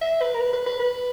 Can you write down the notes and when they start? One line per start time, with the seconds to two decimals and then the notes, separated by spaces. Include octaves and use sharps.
0.02 E5
0.21 B4
0.34 A#4
0.41 B4
0.53 B4
0.67 B4
0.79 B4